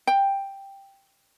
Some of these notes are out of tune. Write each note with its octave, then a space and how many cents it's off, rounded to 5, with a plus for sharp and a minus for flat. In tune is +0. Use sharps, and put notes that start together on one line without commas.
G5 +5